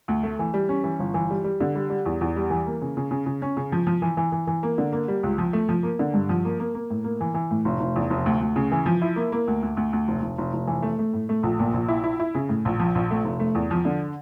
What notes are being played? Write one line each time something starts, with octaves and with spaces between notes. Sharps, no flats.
D2
A3
E3
G3
C#4
E3
G1
E3
G3
G3
D3
G3
G3
E2
E2
G3
E3
A#3
C#3
C#3
C#3
C#3
C#4
C#3
F3
F3
E3
E3
E3
E3
A#3
D3
A#3
G3
C#2
F3
A3
F3
A#3
D3
G2
F3
A#3
A#3
A#3
A2
A#3
E3
E3
A2
F1
F1
E2
F1
D2
D2
C#3
E3
F3
E4
A#3
A#3
D2
D2
D2
D2
F1
F1
F1
F1
E3
A3
A3
A2
A3
A#1
A#2
A#1
E4
E4
E4
C#3
A2
A#1
F3
A#1
A3
F1
A3
E2
F3
D3